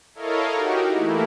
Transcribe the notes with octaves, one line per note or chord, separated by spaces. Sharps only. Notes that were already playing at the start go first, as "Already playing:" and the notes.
E4 A4 A#4 C#5 D#5 F5
D#4 F#4 G4 A#4
E3 A3 A#3 E4